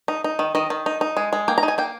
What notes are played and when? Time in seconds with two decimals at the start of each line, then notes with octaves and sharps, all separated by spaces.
0.08 D#4
0.24 D#4
0.39 D#3
0.55 D#3 D#5
0.70 D#3
0.86 D#4
1.01 D#4
1.17 G#3
1.33 G#3
1.48 A#3 G5
1.58 A#5
1.63 D#4
1.68 G#5
1.78 A#3 G5